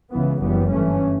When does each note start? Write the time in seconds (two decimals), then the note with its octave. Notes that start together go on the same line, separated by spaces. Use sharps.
0.11 C#2 C#3 E3 B3
0.40 F#1 F#2 E3 G3 B3
0.69 G2 E3 A3 C#4